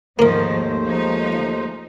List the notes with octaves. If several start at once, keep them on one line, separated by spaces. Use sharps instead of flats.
D#2 G#2 D#3 F3 A3 A#3 A#4 C5
F3 G#3 D#4